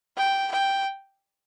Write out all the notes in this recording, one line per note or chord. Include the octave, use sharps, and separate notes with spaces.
G5
G5